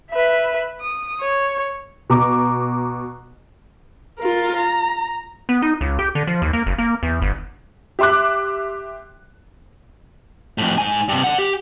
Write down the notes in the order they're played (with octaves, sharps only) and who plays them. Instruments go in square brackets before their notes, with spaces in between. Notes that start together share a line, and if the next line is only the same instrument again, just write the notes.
[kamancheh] B4 E5
D#6
C#5
[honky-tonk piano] B2 A#5 D6
[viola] F4 A#4
A#5
[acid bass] B3
D#4
C#2
G4
D3
F3
D#2
A#3
F#1
A#3
E2
G1
[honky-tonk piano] G4 E5 C6 D6 F#6
[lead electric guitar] F2 A2
G#2 G#5
G2 C3
D3 F#5
G4